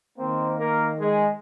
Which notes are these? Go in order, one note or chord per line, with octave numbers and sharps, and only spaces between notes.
D#3 A#3 C4 C5
A#3 A#4
G#3 G#4